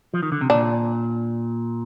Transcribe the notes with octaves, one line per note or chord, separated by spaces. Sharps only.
F3
D#3
D3
C3
A#2 D4